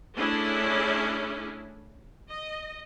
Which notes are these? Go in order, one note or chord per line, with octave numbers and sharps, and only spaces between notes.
A3 C#4 D4 E4 G#4
D#5